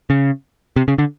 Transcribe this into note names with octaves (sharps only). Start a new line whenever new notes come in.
C#3
C3
C#3
D3